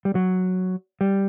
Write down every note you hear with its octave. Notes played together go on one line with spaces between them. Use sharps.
G3
F#3
G3